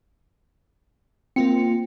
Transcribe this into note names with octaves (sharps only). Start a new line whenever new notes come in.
A#3 C4 F4 C#7